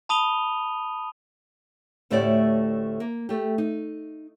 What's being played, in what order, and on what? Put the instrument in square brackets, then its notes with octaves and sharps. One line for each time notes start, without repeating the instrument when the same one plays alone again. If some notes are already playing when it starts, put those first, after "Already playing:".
[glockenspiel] A5 B5 D#6 D#7 F7 G7
[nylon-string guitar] D2 A2 A3 C#4 G4 D5
A#3
A3 G4
D#4